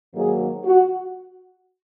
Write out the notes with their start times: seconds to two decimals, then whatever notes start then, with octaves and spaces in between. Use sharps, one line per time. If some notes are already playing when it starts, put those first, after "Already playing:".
0.14 G#2 D#3 F#3 A#3 G#4
0.65 F#4